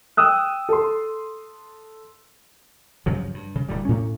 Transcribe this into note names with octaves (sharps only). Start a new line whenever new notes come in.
G5 D#6 E6 F#6
A4 C6
G2 C#3 F3 F#3
G2
C#3
D1 G2 G3
A2 C#4